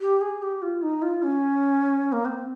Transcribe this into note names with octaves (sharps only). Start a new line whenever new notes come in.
G4
G#4
G4
F4
D#4
F4
C#4
A#3
C4